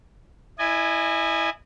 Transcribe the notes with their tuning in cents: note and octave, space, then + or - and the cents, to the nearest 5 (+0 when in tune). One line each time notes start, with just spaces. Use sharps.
E4 +0 D#5 -35 G#5 +0